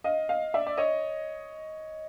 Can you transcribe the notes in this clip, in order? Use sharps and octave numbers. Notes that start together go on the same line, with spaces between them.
D#5 F5
D#5 F5
D5 E5
D5
C#5 D#5